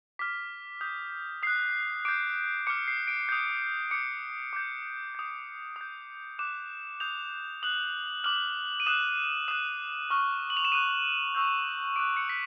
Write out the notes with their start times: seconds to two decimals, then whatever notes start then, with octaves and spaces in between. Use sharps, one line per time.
0.19 D6 F6 B6
0.81 D#6 G6
1.43 D#6 F#6 C7
2.05 D6 G6 D7
2.67 D6 F6 C#7
2.88 C7
3.08 D7
3.29 D#6 G6
3.91 D6 G6 C#7
4.53 D6 G6
5.15 D#6 G6
5.76 D#6 G6
6.39 D6 F#6 E7
7.00 D#6 G6 F7
7.63 D#6 F#6 F#7
8.24 D6 F6 F#7
8.80 D#7
8.87 D#6 F#6 E7
9.48 D#6 F#6 E7
10.10 C#6 F6
10.50 F#7
10.57 F7
10.65 E7
10.72 D#6 F#6 D#7
11.35 C#6 E6 G6
11.96 D6 F#6 D7
12.17 C#7
12.29 B6